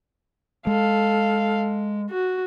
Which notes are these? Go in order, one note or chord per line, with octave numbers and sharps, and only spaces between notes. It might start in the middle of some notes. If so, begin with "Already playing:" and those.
G#3 A4 F5
F#4